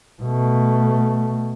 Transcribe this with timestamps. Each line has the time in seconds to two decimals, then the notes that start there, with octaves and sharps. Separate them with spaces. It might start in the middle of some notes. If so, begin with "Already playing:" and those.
0.22 B2 A3